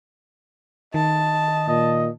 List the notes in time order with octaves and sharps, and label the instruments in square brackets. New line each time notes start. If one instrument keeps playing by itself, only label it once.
[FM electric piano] D#3 [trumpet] D#5 [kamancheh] A5
[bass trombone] A#2 [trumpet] D#5